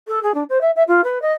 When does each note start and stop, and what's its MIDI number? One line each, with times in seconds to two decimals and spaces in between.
0.08 0.22 69
0.23 0.34 68
0.34 0.44 62
0.50 0.61 72
0.61 0.71 76
0.76 0.83 76
0.88 1.01 65
1.04 1.21 71
1.22 1.32 75